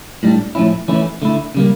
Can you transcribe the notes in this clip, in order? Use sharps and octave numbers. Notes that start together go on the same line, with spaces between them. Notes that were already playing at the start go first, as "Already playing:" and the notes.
A2 G3 D4
A2 F3 C#4 E4
E3 A3 C#4 E4
D3 A3 E4
C#3 G3 A#3